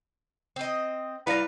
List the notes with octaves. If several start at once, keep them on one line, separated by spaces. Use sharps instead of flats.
C4 D#5
G3 E4 B4 D5 F5 A#6